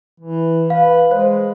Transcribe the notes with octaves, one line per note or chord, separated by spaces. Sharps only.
E3
B4 F5
G#3 C5